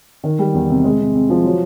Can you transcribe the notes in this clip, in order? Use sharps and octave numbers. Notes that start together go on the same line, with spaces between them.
D#3
G3
E2
C3
G#3
C3
C3
F3
F#3